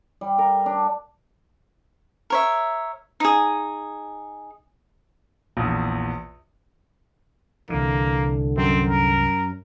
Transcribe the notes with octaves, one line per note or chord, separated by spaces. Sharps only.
G3
A#4
D4
A#4 C#5 E5
D#4 G#4
A#1 E2
C2 D3 E3 A#3
F#2 C4
A#4